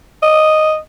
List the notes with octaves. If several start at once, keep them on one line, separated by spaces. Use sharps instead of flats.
D#5